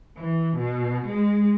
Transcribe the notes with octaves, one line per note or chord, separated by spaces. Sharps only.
E3
B2
G#3